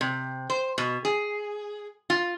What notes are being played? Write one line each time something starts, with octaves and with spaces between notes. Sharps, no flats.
C3
C5
B2
G#4
F4